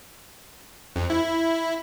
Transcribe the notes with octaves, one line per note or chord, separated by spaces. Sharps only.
F2
E4